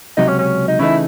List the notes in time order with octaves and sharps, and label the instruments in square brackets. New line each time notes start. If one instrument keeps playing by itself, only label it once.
[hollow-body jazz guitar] C#2 C3 F#3 [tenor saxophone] D#4
[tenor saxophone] C#4
C#4
D#4
[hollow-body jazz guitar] C#3 E3 A3 D#4 [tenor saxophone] E4